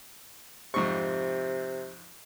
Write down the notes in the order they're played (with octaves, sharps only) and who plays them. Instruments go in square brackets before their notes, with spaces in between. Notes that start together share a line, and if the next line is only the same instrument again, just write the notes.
[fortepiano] F2 G#2 C#6 [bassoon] C3